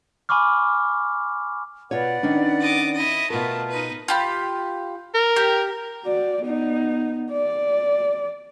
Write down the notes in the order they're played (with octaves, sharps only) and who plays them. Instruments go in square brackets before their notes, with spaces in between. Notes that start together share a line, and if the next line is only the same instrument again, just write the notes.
[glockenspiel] G#5 B5 C#6 D6 F6
[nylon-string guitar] B2 F4 C#5 [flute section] B4 D5 F#5
[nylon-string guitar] D#3 C#4 D4
[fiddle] D#5 D6
E4 D#5
[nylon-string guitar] B2 A#4 [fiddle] A3 B3 [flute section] F4
[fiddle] D#4 B4
[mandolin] F4 G4 B5
[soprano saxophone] A#4
[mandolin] G4
[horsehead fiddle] F#4 D5
B3 D#4
D5